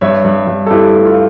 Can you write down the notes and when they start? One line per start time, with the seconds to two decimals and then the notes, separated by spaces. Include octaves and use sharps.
0.01 G2 C#5 E5
0.25 G2
0.47 G2
0.66 A4
0.70 G2 E4 G4
0.94 A3
1.05 F4